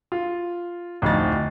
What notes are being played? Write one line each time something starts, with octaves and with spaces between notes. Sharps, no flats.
F4
D1 F2 D#4 A6